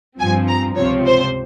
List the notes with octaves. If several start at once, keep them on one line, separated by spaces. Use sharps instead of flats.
G2 F3 C4 G#5
A#5
C#2 C3 F3 C4 C#5
C5